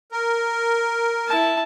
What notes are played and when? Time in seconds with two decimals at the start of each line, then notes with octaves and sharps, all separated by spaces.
0.12 A#4
1.27 E4 A5